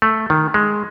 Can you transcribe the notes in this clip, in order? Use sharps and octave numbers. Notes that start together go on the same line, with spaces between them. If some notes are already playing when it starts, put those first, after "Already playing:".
A3
D#3
G#3